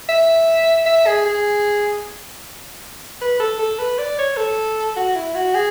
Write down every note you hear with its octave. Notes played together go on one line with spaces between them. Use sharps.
E5
E5
G#4
G#4
B4
A4
A4
B4
D5
C#5
A4
F#4
E4
F#4
G#4